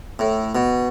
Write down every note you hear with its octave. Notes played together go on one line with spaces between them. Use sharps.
A2
B2